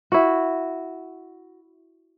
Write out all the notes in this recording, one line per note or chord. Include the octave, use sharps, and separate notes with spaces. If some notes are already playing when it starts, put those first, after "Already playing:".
E4 F#4